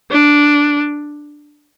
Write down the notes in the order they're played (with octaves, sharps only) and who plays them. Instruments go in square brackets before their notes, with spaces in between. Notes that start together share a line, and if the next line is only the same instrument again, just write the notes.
[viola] D4